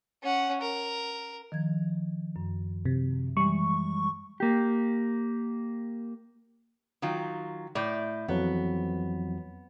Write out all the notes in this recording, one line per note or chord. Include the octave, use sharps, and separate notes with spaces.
C#4 F#5
A#4
D#3 F3 G#6
F#2
C3
E3 G3 G#3 C#6
A#3 G4
D#3 F#3 F4
A2 D5 E5 G6
F2 E3 F#3 B3